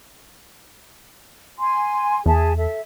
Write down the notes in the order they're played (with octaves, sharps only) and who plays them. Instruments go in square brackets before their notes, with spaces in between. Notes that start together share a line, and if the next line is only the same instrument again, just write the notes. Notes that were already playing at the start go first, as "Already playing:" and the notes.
[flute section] G#5 C6
[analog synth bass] E2 [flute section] G#4 E5 A5
[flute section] A4 E5